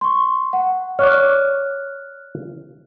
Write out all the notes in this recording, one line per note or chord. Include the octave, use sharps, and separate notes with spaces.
C6 C#6
F#5
C#5 D5 F6 F#6